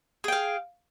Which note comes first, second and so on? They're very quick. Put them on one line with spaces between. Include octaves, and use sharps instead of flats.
G#4 G5 F5